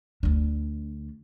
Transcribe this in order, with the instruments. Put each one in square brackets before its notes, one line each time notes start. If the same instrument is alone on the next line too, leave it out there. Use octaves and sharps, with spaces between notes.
[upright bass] D2 D4